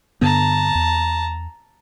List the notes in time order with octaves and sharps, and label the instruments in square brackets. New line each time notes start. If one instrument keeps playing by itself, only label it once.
[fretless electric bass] G2 D3 B3 [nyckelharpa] A5 A#5
[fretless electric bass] E2